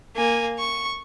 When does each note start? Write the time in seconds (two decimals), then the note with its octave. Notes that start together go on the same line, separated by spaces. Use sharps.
0.16 A#3 G#5
0.59 C#6